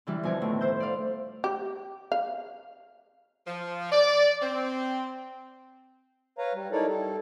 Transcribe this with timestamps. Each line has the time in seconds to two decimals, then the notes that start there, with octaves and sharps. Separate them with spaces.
0.07 D3 E3 G3
0.23 F2 B2 G#5 D6
0.42 A2 D#3
0.61 E4 C5 E6 G6
0.80 D5 F5
1.44 G4
2.12 F5
3.47 F3
3.92 D5
4.42 C4
6.38 B4 C#5 F5 A#5
6.54 G3
6.72 D#4 E4 A4 A#4 C#5 D5
6.87 G3 A4